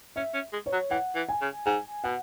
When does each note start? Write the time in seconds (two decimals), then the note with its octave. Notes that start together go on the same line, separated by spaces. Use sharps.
0.16 C#4 E5
0.34 C#4
0.53 G#3
0.66 C#5
0.73 F#3
0.90 E3 F#5
1.15 E3
1.29 G#5
1.41 C#3
1.66 G#2 G#5
2.04 B2 F#5